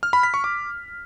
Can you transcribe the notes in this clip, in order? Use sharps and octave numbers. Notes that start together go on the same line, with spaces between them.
F6
B5
B6
C#6
D6